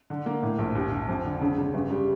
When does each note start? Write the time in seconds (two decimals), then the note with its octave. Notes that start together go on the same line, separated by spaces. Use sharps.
0.10 D3
0.26 A#3
0.43 A2
0.58 A#1
0.75 D#2
0.92 D#2
1.08 F2
1.25 D3
1.41 C#3
1.58 C#3
1.74 G1
1.90 G3